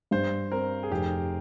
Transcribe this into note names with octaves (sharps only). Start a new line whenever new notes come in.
G2 C5
C4 A#4
G#4
F1 G4